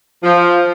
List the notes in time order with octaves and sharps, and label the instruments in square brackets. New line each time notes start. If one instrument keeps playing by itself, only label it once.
[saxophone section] F3